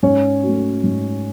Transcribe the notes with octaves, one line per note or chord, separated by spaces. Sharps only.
G#2 C#4 C#5
F#3 A3
G#2